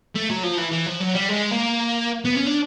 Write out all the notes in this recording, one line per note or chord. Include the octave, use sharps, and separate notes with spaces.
A3
F#3
F3
E3
E3
F3
F#3
G3
G#3
A#3
B3
C#4
D4